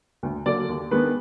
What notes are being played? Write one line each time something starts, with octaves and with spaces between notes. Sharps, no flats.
D2
D3 F#3 A#3 D5
D#2
D#3 G#3 B3 D4 B4